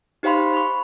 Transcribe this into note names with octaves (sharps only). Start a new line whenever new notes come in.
D#4 G4 C5 F5 B5 C6
B5 C#6